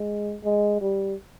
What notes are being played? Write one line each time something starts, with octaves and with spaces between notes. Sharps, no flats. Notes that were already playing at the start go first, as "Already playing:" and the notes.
Already playing: G#3
G#3
G3